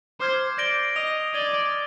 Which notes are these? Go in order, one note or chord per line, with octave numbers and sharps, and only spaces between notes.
C5 D6 F6 G#6 C7
D5 G6 A#6 D7 G7
D#5 D#6 A#6 F7
D5 D6 G#6 D#7 G7
F6